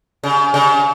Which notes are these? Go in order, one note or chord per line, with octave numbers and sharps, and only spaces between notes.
C#3
C#3